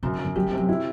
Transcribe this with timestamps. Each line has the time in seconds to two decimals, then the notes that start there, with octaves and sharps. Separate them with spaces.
0.03 F#2 C3
0.13 D3
0.19 F#2
0.25 D3
0.35 F#3 G4
0.46 G3
0.52 C3
0.58 F#3
0.69 D3 E4